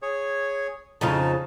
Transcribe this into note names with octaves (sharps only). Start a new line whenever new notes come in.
G#4 C#5
F2 C#3 D#4 F4 A5